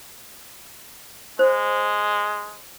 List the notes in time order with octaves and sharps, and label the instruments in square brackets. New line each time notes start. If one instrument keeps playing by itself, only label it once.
[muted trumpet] G#3 [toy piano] C5